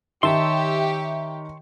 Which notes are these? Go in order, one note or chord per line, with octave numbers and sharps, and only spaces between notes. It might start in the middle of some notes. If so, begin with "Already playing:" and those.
D#3 G4 C#5 E5 A5 C6